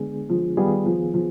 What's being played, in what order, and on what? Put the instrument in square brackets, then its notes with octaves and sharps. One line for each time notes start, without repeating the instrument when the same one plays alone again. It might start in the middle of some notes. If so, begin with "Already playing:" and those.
Already playing: [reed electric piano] D3 G#3 B3 D4 G#4
[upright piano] F3
[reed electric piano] D#3 B3 F4 G#4 [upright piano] G3
[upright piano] F3
F3